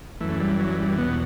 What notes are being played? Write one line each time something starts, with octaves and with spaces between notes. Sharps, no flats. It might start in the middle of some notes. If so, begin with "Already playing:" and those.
F#2 E3 A3
G3
F#3
G3
E2 B2 B3